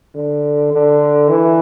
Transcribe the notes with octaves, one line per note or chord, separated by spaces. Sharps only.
D3
D3
E3